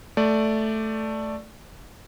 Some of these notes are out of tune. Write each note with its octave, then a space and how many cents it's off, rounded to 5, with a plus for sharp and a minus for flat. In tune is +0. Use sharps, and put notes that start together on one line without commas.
A3 +0 D5 +0